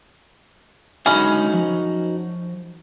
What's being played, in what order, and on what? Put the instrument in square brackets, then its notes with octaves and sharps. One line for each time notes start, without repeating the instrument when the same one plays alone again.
[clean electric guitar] C#2 D3 B5 [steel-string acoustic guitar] F#2 D#4 F#4 [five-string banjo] C#4 G#4
[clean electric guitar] F3